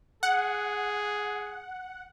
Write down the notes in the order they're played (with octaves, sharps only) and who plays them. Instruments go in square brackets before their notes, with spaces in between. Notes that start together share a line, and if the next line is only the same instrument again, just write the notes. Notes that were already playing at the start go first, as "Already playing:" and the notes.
[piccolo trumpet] G#4 [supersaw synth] F#5